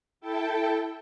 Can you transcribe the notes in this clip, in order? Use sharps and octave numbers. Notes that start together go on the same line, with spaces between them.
E4 A4 G5 A5